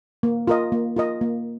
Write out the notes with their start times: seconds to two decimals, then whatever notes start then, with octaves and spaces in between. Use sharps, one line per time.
0.23 A#3
0.47 F4 A#4 D#5
0.72 A#3
0.96 F4 A#4 D#5
1.21 A#3